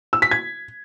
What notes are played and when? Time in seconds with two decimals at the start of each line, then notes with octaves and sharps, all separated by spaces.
0.13 E6
0.22 B6
0.31 G#6